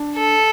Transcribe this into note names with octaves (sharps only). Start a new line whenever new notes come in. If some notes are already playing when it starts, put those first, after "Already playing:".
Already playing: D4
A4